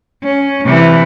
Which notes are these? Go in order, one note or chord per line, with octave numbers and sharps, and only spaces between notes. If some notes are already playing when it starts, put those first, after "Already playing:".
C#4
C3 E3